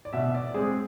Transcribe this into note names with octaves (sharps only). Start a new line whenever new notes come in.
D5
B2 E5
D5
G#3 C4 G#4